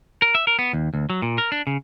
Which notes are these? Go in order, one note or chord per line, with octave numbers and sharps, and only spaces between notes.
A#4
E5
A#4
B3
D#2
D2
F#3
A#2
A#4
D4
C#3